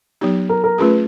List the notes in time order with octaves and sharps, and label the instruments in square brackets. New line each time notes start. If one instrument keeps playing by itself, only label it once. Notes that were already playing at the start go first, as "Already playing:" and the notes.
[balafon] F#3 B3 D#4 G4
[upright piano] A#4
A#4
[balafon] A3 C#4 F4 G#4 [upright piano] B4